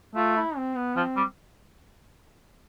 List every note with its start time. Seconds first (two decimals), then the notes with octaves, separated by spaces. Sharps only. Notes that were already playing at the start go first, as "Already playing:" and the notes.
0.16 A3 F4
0.36 E4
0.57 C4
0.76 B3
0.96 F3 C4
1.17 G3